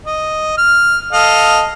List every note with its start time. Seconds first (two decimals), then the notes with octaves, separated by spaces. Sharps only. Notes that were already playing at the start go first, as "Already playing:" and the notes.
0.06 D#5
0.57 F6
1.12 A4 D#5 F5